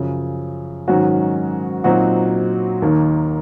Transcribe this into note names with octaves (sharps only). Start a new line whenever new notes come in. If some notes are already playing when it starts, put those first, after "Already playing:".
Already playing: F#2 C#3 F3
G#2 D#3 F#3 C#4 F#4
A#2 F#3 C4 D#4 F#4
D#2 D#3 A#3